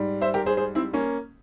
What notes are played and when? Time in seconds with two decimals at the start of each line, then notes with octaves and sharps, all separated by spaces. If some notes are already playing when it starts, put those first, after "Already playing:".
Already playing: G#2 G3
0.21 C5 E5
0.34 G4 A#4
0.46 G#4 C5
0.57 G#4 C5
0.75 C4 E4
0.93 A#3 C#4